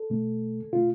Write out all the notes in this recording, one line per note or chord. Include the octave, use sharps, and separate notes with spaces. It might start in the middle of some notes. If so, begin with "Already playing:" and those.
Already playing: A4
B2 A3
B2 A3 F4